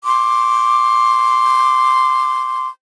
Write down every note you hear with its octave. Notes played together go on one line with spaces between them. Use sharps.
C6 D6